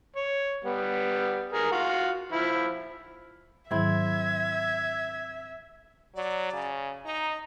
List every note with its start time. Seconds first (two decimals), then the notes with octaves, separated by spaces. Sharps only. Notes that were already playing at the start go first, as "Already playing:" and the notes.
0.16 C#5
0.65 G3 B3
1.53 G#4 A#4
1.72 F4 F#4
2.32 F3 E4
3.71 G#2 D#3 F#3 C4 E4 E5 G#6
6.15 F#3 D5
6.53 C#3
7.06 D#4 A#5